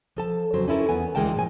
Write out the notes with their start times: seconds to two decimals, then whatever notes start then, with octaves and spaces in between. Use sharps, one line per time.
0.16 F3 A4 A5
0.53 F2 C#3 F#3 C5
0.68 C#4 D#4 E4 A4 A#4
0.89 E2 B3 G#5
1.15 D2 E3 G#3 A#4 G5 A5
1.35 A2 F3 G#5